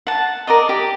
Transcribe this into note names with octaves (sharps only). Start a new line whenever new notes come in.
F#5 A5
A#4 D5 D#5
G4